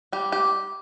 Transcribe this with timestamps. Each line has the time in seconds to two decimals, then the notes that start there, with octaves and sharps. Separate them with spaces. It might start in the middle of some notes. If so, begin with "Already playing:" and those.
0.13 G3 G4
0.32 G4